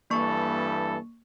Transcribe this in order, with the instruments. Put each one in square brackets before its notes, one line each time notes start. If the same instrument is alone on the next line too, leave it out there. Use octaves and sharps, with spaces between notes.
[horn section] G2 E3 A4 [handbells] A#3 C#6